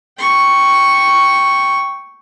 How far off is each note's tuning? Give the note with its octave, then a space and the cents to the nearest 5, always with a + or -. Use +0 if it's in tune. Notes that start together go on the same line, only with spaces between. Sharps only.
G5 +0 C#6 +0